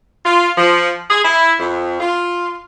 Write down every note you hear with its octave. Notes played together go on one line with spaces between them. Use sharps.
F4
F3
G#4
E4
F2
F4